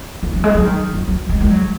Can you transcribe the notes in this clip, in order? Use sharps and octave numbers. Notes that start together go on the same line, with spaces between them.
D#3
F#3
G#3
F#3
D#3
F#3
F#3
G#3
G#3
F#3